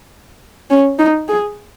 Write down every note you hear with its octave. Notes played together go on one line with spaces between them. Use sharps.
C#4
D#4
G#4